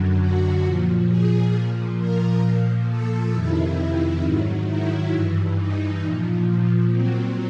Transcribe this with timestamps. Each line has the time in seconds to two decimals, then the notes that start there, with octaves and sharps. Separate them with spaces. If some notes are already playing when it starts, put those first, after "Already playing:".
Already playing: F#2 D3 F#3
0.18 F#4
0.63 A#2 F3
1.08 G#4
1.53 A#2 F3
1.98 A#4
2.43 A#2 F3
2.88 A4
3.32 F2 C3 D#3 E4
4.22 G#2 D#3 F#3
4.67 E4
5.12 G2 E3
5.57 D#4
6.02 A#2 F3
6.91 A#2 F#3 C4